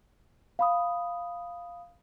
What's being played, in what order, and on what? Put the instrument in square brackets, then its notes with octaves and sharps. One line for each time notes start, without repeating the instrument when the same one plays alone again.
[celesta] F5 B5 D#6